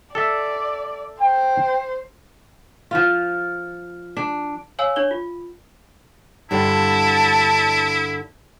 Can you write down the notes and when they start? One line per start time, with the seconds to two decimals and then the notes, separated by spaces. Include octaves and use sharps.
0.15 A4 D5 E5
1.21 C5 G5
2.91 F3 F4
4.17 D4
4.79 C#5 F5 G#5 E6
4.96 D4 C#5 G7
5.11 F4
6.51 G2 D3 E4 A5